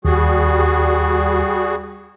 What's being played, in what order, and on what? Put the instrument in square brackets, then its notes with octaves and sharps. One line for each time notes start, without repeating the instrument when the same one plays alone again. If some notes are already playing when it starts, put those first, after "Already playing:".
[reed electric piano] D#2 [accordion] G3 F#4 G#4